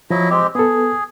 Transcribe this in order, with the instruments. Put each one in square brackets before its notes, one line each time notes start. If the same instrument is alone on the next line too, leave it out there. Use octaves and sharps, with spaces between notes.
[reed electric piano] F3 [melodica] F#3 E4 D#5
[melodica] G#3 C4 G4
[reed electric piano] B3 A4 [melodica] G#4